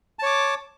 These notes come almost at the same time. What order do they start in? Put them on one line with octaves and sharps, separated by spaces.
A5 C#5 D6